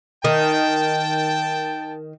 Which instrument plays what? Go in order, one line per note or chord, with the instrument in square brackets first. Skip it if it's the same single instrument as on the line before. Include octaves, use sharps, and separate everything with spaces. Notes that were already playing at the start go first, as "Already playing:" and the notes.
[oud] D#3 [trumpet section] G5 A5